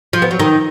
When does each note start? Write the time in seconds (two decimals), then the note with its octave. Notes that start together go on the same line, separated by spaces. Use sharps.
0.13 F3
0.22 B3
0.31 F#3
0.40 D#3